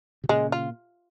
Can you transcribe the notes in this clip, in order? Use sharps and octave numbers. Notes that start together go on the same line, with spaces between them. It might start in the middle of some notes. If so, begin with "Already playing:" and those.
C3
A#2 C#3 G#3
F4